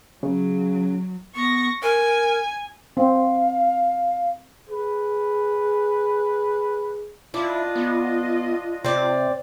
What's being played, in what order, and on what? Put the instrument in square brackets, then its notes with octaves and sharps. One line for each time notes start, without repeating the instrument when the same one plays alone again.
[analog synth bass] C#3 [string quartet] F#3
[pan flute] B3 [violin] C#6 A#6
[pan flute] A#4 [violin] G#5
[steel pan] C4 [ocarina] F5
[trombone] G#4 [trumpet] B4
[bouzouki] D4 [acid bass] E4 [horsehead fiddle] F4 D#5
[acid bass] B3
[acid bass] C3 [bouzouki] C4 D5